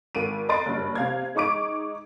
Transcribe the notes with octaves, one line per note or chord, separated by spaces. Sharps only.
G#1 D7 D#7
D#5 A#5 C6 A6 D7
F#1 G2
C3 F5 G#6
G#3 D#4 C#6 D6 D7